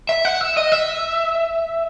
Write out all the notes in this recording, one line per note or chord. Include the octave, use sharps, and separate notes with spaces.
E5
F#5
E5
D#5
E5